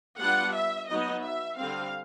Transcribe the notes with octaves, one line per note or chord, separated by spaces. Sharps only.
G3 B3 D4 F4 F#5
E5
F#3 B3 D#4 D#5
E5
D3 G3 C4 F5